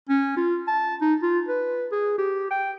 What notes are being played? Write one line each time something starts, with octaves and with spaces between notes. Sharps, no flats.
C#4
F4
A5
D#4
F4
B4
G#4
G4
G5